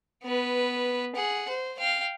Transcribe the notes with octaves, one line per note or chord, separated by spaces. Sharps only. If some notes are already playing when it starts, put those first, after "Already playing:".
B3 B4
G#4 F#5
C5
F5 G5